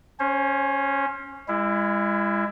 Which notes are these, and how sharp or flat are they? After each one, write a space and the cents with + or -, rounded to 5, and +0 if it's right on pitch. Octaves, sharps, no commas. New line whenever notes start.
C#4 +0 C5 +35
G#3 -35 E4 +20